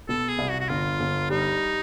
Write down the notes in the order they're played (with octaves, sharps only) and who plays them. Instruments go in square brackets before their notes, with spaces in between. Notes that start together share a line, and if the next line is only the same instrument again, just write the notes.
[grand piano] B2 [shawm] A4
[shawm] G#4
[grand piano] C2
[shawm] F#4
F#4
[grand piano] G1 [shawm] F4
[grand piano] G1
[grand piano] G3 [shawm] D#4